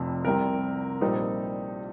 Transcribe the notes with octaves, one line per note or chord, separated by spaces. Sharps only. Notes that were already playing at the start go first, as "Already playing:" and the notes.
Already playing: F1 F2 C3
C2 C3 G3 A#4
A#1 A#2 G3 C4 D#4